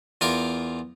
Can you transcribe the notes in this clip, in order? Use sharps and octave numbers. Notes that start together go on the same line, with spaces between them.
E2 F4 A#4 D6